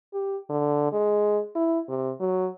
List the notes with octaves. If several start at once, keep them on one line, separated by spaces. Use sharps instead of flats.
G4
D3
G#3
E4
C3
F#3